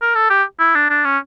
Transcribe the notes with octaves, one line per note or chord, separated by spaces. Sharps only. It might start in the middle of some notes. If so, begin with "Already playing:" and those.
A#4
A4
G4
E4
D4
D4
C#4